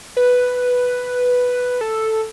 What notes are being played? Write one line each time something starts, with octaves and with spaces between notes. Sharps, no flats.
B4
A4